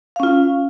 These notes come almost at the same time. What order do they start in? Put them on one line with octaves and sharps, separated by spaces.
F5 C#4 F4